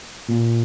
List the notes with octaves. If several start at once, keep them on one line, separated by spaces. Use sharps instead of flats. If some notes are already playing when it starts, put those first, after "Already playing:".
A#2